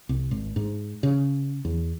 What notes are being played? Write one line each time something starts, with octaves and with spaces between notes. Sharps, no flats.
C2
G#1
G#2
C#3
E2